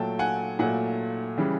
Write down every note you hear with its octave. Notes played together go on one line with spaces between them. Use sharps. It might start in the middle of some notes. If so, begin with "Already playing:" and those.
Already playing: A#2 F#3 A3 G5 A5
F#5 G#5
A#2 F#3 A3 F#5 G#5
C#3 E3 G3